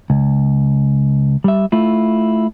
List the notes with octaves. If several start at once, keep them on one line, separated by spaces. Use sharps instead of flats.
C#2
G3 E5
A3 E4 F4